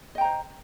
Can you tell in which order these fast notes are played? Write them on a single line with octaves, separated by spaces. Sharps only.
D#5 G5 A#5 C5